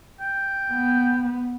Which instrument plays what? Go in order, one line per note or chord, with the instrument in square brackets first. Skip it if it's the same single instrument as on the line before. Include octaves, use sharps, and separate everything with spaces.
[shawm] G5
[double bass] B3